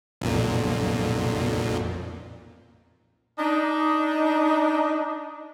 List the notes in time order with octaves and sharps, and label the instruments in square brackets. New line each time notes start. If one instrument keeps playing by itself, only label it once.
[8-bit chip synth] B1 F2 A#2
[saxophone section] D4 D#4